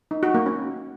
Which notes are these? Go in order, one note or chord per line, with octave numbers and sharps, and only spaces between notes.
D#4
F#4
A#3
C#4